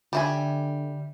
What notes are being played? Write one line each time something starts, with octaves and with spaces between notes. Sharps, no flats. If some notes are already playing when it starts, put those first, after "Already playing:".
D3 G3 E5 G#5